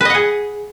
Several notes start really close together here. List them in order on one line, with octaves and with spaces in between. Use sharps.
B4 D#5 F#5 G#4